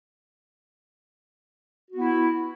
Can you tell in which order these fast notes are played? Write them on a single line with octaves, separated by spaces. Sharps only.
F#4 B3 E4